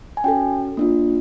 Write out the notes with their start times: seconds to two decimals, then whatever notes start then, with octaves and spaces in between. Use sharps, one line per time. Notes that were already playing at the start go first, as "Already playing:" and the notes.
0.17 G#5
0.24 C#4 F#4 A4 G5
0.77 A#3 D4 F4